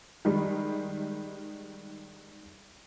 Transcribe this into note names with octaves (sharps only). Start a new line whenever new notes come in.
D#3 G3 G#3